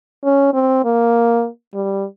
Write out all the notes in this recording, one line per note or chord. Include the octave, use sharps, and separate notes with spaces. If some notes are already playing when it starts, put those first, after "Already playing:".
C#4
C4
A#3
G3